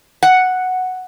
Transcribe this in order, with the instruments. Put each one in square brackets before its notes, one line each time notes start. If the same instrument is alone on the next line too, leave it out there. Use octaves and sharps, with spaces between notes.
[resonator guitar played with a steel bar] F#5